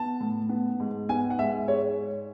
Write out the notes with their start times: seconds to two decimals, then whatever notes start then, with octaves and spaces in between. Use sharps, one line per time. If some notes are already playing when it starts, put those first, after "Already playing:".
Already playing: B3 A5
0.21 A2
0.49 B3
0.80 G#2
1.09 B3 G#5
1.30 F#5
1.38 G#2 E5
1.68 G#3 C#5